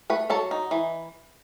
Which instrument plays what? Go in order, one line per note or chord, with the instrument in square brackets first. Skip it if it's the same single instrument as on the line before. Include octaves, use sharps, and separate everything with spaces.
[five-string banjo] A3 B4 B5
F#3 A4 A5
D#4
E3